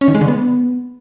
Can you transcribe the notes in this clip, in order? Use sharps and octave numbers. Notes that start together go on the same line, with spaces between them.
C#4
D#3
G#3
D3
B3